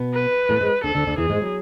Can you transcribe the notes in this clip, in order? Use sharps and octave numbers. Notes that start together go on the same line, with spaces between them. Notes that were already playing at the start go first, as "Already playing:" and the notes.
Already playing: B2 B3
B4
A2 A3
G#2 G#3
D2 D3 A4
D2 D3
D2 D3
E2 E3 G#4
G#2 G#3
F#3